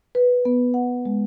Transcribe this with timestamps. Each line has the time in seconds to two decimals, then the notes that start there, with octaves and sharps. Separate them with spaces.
0.15 B4
0.45 B3
0.74 F#5
1.05 G#3